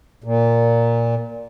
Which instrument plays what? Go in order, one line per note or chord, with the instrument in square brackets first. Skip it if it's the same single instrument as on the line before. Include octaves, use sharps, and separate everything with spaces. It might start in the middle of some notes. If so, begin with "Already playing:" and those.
[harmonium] A#2